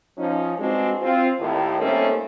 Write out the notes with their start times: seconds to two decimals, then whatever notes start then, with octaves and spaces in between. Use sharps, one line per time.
0.18 F3 C#4 D#4
0.58 G2 G#3 C4 D4 F#4
1.02 C4 F4
1.39 D#2 A2
1.81 G3 A3 A#3 C4 C#4 D#4